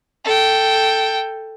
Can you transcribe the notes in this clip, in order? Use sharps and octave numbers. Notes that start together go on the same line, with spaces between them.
A4 G5